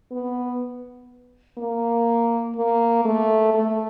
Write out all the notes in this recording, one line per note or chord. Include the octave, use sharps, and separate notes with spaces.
B3
A#3
A#3
A3
A3